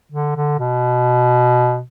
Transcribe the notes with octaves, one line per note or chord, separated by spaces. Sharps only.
D3
D3
B2